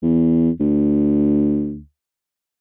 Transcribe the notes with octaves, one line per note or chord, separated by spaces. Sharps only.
E2
D2